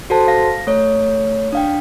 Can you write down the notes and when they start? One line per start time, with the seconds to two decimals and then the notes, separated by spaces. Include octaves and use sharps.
0.10 F#4 A4 C5 A5
0.28 F5 A#6
0.67 A3 C#5
1.52 D4 F5 G5